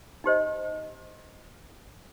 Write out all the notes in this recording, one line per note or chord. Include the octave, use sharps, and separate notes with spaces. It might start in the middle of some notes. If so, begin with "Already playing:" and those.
D#4 G4 C5 D#5